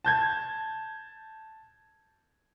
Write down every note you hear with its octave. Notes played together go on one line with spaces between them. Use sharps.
A5 G6 G#6